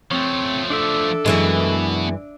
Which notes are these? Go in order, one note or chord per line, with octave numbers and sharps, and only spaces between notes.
F3 A3 C4 C#5
D4 A4 D5 E5
F#2 B2 E3 G#3